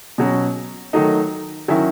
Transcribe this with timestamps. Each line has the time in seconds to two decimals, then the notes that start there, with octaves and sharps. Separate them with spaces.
0.18 B2 F#3 C#4
0.93 D#3 F#3 A3 D#4
1.68 D#3 F#3 C#4 E4